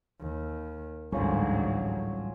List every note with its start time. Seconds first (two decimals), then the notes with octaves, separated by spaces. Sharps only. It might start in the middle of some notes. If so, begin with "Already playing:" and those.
0.20 D#2
1.12 A1 D2 G#2 F#3 G3 C#4 F4 C5